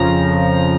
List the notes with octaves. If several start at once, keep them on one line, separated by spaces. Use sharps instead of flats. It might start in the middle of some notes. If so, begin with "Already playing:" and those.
Already playing: F2 C#3 F3 A#5